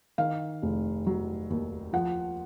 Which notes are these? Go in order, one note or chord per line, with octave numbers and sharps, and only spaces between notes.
D#3 F5
F1
F#3
D#2
F3 F#5